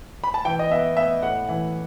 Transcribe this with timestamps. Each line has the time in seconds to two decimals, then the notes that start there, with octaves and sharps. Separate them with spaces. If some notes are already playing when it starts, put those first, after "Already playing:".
0.24 B5
0.34 A5
0.45 E3 G5
0.59 D#5
0.71 B3 E5
0.97 B3 E5
1.22 A2 F#5
1.48 E3